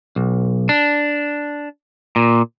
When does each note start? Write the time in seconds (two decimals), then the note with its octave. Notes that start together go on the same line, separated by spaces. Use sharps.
0.16 B1
0.69 D4
2.16 A#2